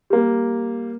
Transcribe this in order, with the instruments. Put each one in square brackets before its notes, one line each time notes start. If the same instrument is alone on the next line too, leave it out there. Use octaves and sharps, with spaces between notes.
[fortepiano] G3 A#3